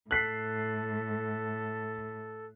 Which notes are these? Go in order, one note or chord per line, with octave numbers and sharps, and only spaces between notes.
A2 A4 F#6 B6 C7